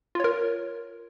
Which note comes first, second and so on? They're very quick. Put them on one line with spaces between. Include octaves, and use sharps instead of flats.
F4 C#5 A#4